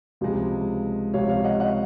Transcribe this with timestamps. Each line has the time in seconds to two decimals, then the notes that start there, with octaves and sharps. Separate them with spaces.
0.21 C#2 C3 F3 G#3
1.14 C#2 C3 F3 C#5 F5
1.29 C#5 F5
1.44 D#5 F#5
1.59 D#5 F#5